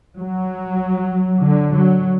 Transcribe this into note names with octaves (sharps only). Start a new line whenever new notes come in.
F#3
D3
F#3